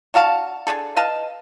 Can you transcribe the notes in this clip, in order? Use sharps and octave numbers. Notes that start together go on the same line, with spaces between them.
D4 F#4 F5 A5
D4 D#4 G#4 A4
B4 D#5 F5 A5